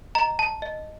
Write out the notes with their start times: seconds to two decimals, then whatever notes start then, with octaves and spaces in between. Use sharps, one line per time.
0.15 D#5 A#5
0.39 A5
0.62 D#5